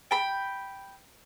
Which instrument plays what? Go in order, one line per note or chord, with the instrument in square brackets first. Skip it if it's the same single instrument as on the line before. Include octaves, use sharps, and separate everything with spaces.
[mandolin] G5 B5